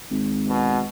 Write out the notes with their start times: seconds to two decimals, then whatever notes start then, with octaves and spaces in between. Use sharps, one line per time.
0.11 G#1
0.48 B2